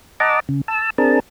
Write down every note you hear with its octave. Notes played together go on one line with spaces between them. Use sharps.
D#5 F#5 A5 A#5 D6
C#3
A5 E6
C4 D4 G#4 A#4 A5